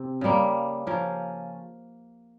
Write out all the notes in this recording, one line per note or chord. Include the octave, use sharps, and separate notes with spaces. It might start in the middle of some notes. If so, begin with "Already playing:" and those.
Already playing: C3 C4
C#3 G3 A#3
F3 A#3 C#4